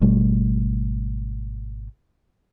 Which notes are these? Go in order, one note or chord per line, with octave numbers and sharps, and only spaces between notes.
G#1 B2 G3 A3